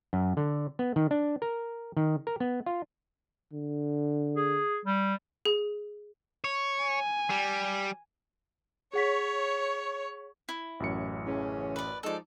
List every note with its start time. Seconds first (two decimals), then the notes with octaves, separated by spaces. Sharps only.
0.13 F#2
0.37 D3
0.79 B3
0.96 D#3
1.11 D4
1.42 A#4
1.97 D#3
2.27 A#4
2.40 B3
2.66 F4
3.53 D3
4.36 G#4
4.85 G3
5.45 G#4
6.44 C#5
6.83 G#5
7.30 G3
8.93 G#4 C#5 F#5 B6
10.49 E4
10.80 A1 F#2 C#7
11.27 C#3 E3 C#4
11.76 B4 D5
12.03 F3 G#3 D#4 A4 D5